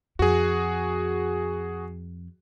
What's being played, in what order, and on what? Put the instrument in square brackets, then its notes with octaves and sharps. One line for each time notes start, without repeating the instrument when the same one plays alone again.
[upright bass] F2 [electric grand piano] F#4 G#4